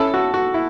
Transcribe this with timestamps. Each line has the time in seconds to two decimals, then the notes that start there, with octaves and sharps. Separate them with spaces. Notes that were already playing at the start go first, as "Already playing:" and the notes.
Already playing: C#4 E4 A4
0.14 F#4
0.34 F#4
0.54 E4